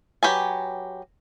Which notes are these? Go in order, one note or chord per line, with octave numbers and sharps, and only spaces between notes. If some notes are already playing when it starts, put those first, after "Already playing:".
F#3 G4 B4 G#5